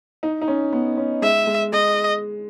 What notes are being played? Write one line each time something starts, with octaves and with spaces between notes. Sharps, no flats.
D#4
D#4
C#4
B3
C#4
G#3 E5
G#3
G#3 D#5